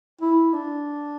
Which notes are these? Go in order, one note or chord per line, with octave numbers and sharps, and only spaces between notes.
E4
D4